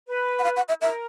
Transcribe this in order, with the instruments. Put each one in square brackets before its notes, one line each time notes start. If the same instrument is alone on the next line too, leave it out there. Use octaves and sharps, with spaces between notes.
[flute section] B4
[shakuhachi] F#5
F5
F#5
E5
[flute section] A#4 [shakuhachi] E5